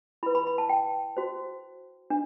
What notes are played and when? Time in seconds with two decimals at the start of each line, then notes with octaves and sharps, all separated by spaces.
0.23 E4 B5
0.26 B4
0.35 B5
0.47 B5
0.58 A5
0.69 G5
1.17 F#4 C5
2.10 D4